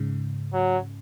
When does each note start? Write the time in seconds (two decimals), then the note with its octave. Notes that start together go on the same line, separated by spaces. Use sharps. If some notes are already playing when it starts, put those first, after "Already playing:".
Already playing: G#2 C#3
0.54 F#3